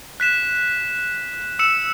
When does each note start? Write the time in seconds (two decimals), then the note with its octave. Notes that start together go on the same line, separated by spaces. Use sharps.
0.20 F#6 B6 E7
1.59 E6 C#7 E7